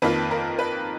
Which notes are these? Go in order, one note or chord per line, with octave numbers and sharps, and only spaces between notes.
F2 D#3 A#3 F4 B4
A#4
B4